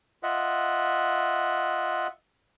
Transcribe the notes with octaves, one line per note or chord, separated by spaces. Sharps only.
F4 D#5 E5 F#5